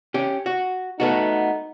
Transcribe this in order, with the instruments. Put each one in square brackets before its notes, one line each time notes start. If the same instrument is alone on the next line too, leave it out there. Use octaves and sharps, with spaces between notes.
[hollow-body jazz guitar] C#4 G4
F#4
[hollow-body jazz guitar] A3 B3 F#4 [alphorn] D#4